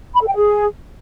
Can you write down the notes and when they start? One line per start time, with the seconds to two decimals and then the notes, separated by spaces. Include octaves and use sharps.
0.15 B5
0.21 A4
0.28 G5
0.34 G#4